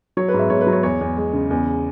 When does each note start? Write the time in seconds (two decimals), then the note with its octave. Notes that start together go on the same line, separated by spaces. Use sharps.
0.17 F#3 C#5
0.28 B4
0.34 G#2
0.39 E5
0.50 G#2 C#5
0.61 B4
0.67 F#3
0.73 C#5
0.83 E2 C#5
1.01 E2
1.17 G#3
1.33 C#3
1.51 E2